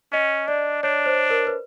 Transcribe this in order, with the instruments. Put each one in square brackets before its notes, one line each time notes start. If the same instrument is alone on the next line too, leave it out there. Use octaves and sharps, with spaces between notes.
[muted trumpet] C#4 [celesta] D#5
[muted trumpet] D4 [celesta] D5
[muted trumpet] D4 [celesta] C#5
[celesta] C5
A#4
B4